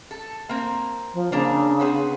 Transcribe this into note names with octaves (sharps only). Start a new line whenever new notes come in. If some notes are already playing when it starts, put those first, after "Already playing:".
A4
A#3 C4
F3
C#3 A#3 D4
B3 C4 G#4